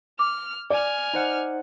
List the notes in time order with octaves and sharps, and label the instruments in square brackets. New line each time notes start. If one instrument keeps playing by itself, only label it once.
[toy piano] D6 [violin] F6
[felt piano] D5 [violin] G#5 F6
[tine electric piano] D#4 C5 F#5